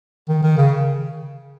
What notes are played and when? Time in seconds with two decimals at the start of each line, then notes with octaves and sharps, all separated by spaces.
0.29 D#3
0.43 D#3
0.58 C#3